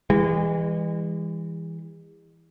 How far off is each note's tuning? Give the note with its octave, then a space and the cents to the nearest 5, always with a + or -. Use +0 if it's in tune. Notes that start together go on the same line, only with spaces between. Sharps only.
E3 +0 G#3 -40